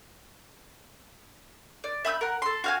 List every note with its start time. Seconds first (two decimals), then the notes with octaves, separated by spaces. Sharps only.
1.84 D5
2.05 E5 B5 D#6 G6
2.21 A#4 F#5
2.42 A4 C6
2.64 F#4 F5 G#5